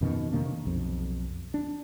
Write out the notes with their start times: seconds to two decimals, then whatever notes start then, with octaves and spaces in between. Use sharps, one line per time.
0.01 F2 B2 D#3 C#4
0.32 C3 D#3 A#3 D4
0.65 B1 F2
1.54 D4